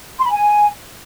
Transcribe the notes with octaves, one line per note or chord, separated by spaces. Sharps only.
C6
B5
G#5